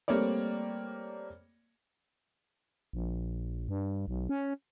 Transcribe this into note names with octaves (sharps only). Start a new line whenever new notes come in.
G3 A3 A#3 C4 C#5 D5
A#1
G2
B1
C#4